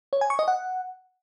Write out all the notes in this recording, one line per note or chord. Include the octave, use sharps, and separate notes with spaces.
C#5
G#5
C#6
D#5
F#5